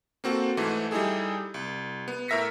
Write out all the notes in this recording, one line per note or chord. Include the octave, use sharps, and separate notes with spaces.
A#3 C4 F#4 A4
G#2 E3 A3
G3 D#4 E4 G#4 A4
C2
B3
A2 A#4 E5 A#6 B6 C#7